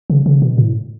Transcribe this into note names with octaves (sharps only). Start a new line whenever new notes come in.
C#3
C#3
B2
A2